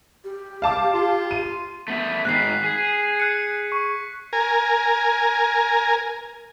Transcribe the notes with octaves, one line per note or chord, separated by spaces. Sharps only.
G4
F5 A5 D6
F4
D#7
A3 B3 E5
G#2 D#3 F#6 B6 C7
G#4
F#6 C#7
C#6
A#4 G#5